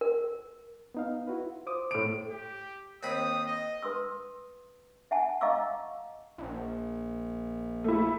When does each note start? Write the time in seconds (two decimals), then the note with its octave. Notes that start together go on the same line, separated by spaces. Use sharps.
0.01 A#4
0.94 B3 D#4 F5
1.27 E4 F#4 B4
1.44 F4
1.67 C5 D6 D#6
1.91 A2 D7
2.30 G4
3.03 D#2 C4 B5 D#6
3.47 D#5
3.83 B4 C6 D#6 E6
5.11 E5 F#5 G#5 A5
5.41 D#5 F5 A#5 C#6 D6 E6
6.38 A#1
7.84 A3 E4